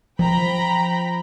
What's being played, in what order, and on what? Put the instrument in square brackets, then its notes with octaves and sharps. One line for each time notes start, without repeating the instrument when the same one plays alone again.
[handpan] F3 [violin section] G5 A#5 B5